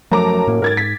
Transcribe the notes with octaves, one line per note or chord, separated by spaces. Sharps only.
F#2 F3 F#3 A3 A5 A#5 D6
A2 A#3
G#2 A#4 G#6 A6
B6